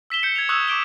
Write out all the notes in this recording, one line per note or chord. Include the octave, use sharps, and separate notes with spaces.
E6 B6 E7 G7
G6 C#7
G#6 F7
C#6 D#6 E6 F#6 G#6 F7
C#6 D6 C#7 D7 E7 G7